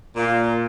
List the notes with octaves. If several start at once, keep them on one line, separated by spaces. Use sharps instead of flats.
A#2